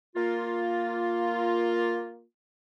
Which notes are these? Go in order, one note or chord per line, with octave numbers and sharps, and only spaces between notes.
A#3 F4